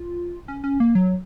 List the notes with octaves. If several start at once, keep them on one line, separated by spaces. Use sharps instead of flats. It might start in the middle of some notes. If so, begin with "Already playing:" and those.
Already playing: F4
C#4
C#4
A#3
F#3